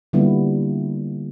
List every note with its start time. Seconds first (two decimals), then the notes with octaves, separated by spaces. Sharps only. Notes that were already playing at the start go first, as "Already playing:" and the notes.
0.13 D3 G3 A#3 B3 E4 F4